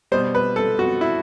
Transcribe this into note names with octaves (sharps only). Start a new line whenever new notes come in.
B2 G3 C5
B4
A4
F#4
E4